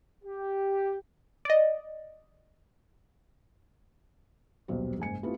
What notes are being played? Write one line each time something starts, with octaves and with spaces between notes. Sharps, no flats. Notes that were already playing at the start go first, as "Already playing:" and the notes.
G4
D5 D#5
D#1 B1 B2 G3 G4 C5
F#1 G#2 G#5 C#7
A3 B3 C4 E4 F4 G4